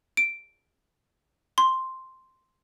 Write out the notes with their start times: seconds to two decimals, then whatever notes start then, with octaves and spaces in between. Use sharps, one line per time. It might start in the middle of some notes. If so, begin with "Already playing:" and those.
0.17 D7
1.58 C6